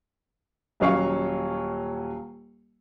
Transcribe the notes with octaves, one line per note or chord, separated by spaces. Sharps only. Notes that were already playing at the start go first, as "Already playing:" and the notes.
D#1 F#3 C#4 F5 C#6